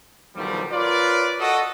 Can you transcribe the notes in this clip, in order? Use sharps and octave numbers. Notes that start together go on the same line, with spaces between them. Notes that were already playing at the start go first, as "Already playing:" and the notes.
B1 D3 D#3 F3 G3
F4 A#4 B4 C#5 D5
F#4 A4 D#5